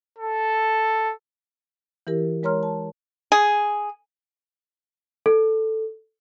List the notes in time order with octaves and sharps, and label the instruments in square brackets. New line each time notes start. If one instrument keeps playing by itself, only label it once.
[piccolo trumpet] A4
[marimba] E3 E4 G4 A#4
G#3 A#4 C#5 A#5 C6 F6
A5
[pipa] G#4
[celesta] A4